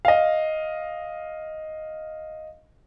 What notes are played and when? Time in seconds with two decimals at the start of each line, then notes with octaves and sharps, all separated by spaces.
0.05 D#5 F5